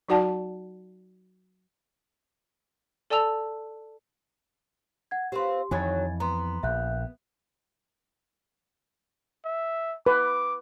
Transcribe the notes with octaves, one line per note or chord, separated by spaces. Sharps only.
F#3 D#4 F#4 D5 F#5 A5
A4 D5 G#5 A5 E6 F7
F#5 G#6
C4 F4 G4 B4 C6
F2 D#3 E3 F#3 C#5 G#5 G#6 A6
B3 A#5 C6
A#1 E5 F#6 G6
E5
B4 D6